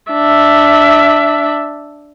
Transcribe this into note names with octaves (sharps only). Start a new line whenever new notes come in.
D4 E5